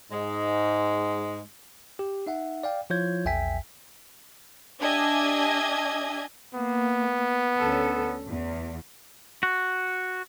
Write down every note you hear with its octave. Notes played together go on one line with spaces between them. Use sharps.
G#2 G#3
G4
D#4 E5 F#5
D5 F5 G5
F3 E4 F4 C#5 G6 G#6
A#1 E2 E5 G5 G#5 B6
D4 G4 D#5 E5 G#5 G#6
A#3 B3
D2 C#4 A4
E2
F#4